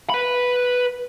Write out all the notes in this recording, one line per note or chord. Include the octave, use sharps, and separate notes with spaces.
B4 B5